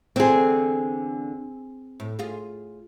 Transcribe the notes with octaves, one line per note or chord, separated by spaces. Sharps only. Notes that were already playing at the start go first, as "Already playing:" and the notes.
E2 D3 C4 G#4 C5
A2
F4 G#4